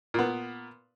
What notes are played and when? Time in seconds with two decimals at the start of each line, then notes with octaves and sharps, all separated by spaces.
0.14 A#2 B3